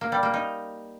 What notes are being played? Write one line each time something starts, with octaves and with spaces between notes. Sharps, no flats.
A#3
G3
A#3
D#4